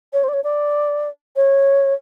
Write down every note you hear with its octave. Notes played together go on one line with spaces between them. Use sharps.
C#5
C5
D5
C#5
D5
C#5